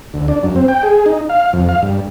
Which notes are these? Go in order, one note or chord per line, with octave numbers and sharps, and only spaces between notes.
D2
D4
F#2
C4
G5
G#4
D#4
F5
F2
F5
G2